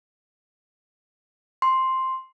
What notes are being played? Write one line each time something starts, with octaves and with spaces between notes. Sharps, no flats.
C6